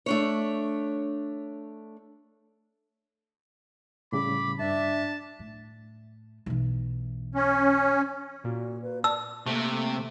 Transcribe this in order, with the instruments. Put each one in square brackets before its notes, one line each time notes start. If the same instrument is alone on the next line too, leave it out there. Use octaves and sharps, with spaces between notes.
[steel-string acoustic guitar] A3 D4 C#5
[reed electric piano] A2 C#3 G3 [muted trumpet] B5 [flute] D6
[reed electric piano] G2 [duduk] D4 [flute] E5 [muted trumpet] A5
[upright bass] A2
B1 E3
[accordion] C#4
[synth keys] A#2 [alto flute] F#4
[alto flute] B4
[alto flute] D5 [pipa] A5 [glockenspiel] E6
[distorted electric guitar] C3 [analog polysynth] A3 [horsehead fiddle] A#3